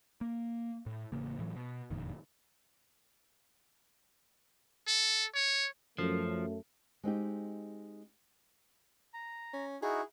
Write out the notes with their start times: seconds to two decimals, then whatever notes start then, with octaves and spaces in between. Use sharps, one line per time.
0.21 A#3
0.86 A2
1.12 A1 C#3 A#3
1.39 A2 E3 F#3
1.56 B2
1.91 F#1 F2 A#2 D#3
4.87 A4
5.35 C#5
5.98 F#2 F3 A3
7.04 G#3 C4 D#4 G4
9.14 A#5
9.53 C#4
9.82 D#4 E4 F#4 G#4